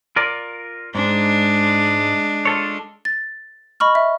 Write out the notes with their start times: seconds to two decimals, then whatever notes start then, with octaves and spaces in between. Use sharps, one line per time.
0.16 F4 A#4 D5
0.95 G#2 G#3 D4
2.45 F4 A4 C#5
3.05 A6
3.80 D#5 B5 C#6 F6
3.95 E5